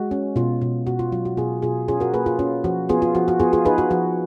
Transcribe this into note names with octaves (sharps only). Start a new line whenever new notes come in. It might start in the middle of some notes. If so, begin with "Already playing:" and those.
Already playing: G#3 F#4
C#4
B2 F4
B2
B2 F#4
F4
F#3 F4
F#4
B2 F4 G#4
B2 F4 G#4
C#4 F4 G#4
F#4 A#4
A#3 G#4 B4
F4 G#4
C#4 F4
F3 F#4
B3 F4 G#4
F4
F3 F#4
F#4
B3 F4 G#4
F4 G#4
D#4 G#4 B4
F#4
F3 F#4